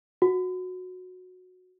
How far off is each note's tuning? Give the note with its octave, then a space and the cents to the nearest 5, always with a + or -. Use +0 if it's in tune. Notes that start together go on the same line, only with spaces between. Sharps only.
F#4 -15